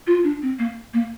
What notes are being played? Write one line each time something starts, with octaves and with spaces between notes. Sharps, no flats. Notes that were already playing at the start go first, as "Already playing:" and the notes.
F4
D4
C4
A#3
A#3